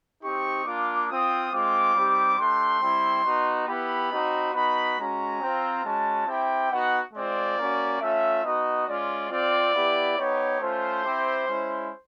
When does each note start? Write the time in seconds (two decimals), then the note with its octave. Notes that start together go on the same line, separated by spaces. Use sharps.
0.22 C4 D#4 G4 C#6
0.65 A#3 D4 F4 D6
1.09 C4 F4 D#6
1.52 G#3 C4 F4 D6
1.94 G3 C4 D#4 G4
2.38 A3 D4 G4 C6
2.81 G3 C4 E4
3.25 B3 D#4 F#4
3.68 B3 E4 G4 B5
4.11 C4 D#4 F#4
4.54 B3 D#4 F#4 B5
4.97 G#3 C#4 F#4 A#5
5.41 C4 F4
5.84 G#3 C#4 F#4 A5
6.27 C4 E4 G4 G5
6.70 B3 D#4 F#4 F#5
7.14 G#3 C4 F4 D5
7.57 A#3 C#4 F#4
8.01 A3 C#4 F4 E5
8.43 B3 D#4 F#4 D#5
8.87 G#3 C#4 F4 D5
9.30 C4 F4 D5
9.74 B3 E4 G4
10.17 B3 D#4 G4 C#5
10.60 A3 C#4 F4 C5
11.04 C4 E4 G4
11.47 G#3 C#4 E4